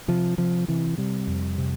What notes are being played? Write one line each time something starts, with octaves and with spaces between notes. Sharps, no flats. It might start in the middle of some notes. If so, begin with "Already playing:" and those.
C3 F3
C3 F3
C3 E3
C3 G3
F2
C3